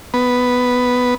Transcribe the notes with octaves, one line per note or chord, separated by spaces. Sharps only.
B3